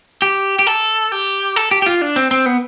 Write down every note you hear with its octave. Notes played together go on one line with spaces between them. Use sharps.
G4
G4
A4
G4
A4
G4
G4
F4
D4
C4
C4
B3